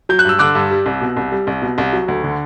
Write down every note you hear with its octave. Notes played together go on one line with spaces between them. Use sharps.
F#3 G6
F#6
G2 E6
D3 D6 F#6
G2
G3
C2
B2
C2
G3
C2
B2
C2
F#3
D2
D3